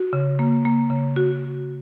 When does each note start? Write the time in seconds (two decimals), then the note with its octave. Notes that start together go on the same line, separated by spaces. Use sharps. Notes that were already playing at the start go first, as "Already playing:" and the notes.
Already playing: F#4
0.13 C#3
0.39 A#3
0.65 A#3
0.90 C#3
1.16 F#4